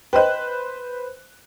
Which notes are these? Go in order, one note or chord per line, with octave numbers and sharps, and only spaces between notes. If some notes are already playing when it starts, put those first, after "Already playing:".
B4 C5 D#5 G5 F#6